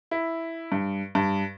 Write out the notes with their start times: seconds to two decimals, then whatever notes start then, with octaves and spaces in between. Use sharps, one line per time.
0.11 E4
0.72 G2
1.15 G2